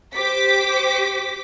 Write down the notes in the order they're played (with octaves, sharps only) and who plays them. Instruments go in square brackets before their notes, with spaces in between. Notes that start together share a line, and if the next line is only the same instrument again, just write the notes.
[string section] G4 C5 D6 B6